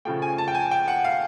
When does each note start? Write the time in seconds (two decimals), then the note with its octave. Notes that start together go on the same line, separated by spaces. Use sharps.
0.05 C#3 F3 A3 G5
0.22 G#5
0.38 A5
0.48 G5
0.55 G#5
0.71 G5
0.88 F#5
1.04 F5